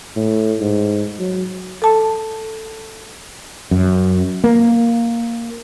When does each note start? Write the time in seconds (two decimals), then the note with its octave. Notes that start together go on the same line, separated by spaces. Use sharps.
0.16 A2
0.60 G#2
1.20 F#3
1.82 A4 A5
3.71 F#2
4.44 A#3